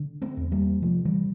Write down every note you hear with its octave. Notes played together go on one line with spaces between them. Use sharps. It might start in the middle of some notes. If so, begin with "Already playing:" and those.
Already playing: D3
A3 C4
E2
G3 A#3
C3 F3 A3
E3 G3